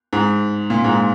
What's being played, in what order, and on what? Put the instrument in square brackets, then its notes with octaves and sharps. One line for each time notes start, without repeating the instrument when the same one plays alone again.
[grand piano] G#2
A#2
G#2